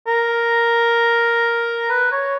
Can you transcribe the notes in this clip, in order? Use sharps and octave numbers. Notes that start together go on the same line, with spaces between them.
A#4
B4
C#5